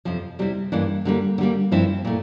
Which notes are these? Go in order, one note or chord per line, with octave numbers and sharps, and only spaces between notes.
F2 C3 F3
C3 G3 C4 E4
G2 E3 A#3 D4
D3 G3 A#3
D3 G3 A#3
G2 F3 C4 E4
A#2 A3